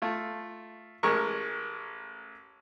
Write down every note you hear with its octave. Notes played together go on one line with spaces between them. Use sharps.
A3 F4
A1 G#3 A#4 C#6